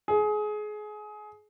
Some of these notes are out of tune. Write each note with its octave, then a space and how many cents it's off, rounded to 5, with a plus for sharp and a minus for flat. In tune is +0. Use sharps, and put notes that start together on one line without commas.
G#4 +25